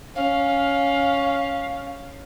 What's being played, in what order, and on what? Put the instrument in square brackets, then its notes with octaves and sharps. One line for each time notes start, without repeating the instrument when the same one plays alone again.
[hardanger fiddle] C#4 [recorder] F5